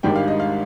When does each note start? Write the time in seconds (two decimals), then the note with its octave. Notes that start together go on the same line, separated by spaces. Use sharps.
0.03 G#1 G#2 D#3 G3 D4 G5
0.16 F5
0.28 D#5
0.40 F5